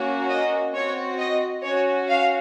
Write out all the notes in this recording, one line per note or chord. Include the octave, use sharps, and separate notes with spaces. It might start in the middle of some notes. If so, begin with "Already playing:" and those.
Already playing: A#3 C#4 F#4
D#5
C4 F#4 C#5
D#5
C#4 F#4 C#5
F5